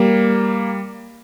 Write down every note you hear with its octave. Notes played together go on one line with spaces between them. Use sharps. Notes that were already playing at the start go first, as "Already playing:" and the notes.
Already playing: G3 A#3